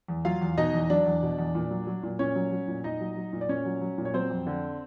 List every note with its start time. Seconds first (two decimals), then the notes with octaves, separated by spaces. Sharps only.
0.08 E2
0.25 F#3 F4 F5
0.41 E2
0.58 B2 D#4 D#5
0.74 E2
0.90 F#3 D4 D5
1.06 E2
1.23 B2
1.38 E2
1.55 A#2
1.71 F#3
1.87 F#3
2.03 A#2
2.19 A#2 C#4 C#5
2.36 F#3
2.52 F#3
2.68 A#2
2.84 A#2 D#4 D#5
3.01 F#3
3.17 F#3
3.33 A#2
3.41 D5
3.49 A#2 C#4 C#5
3.65 F#3
3.81 F#3
3.98 A#2
4.05 C#5
4.14 F#3 C4 C5
4.30 F2
4.47 D3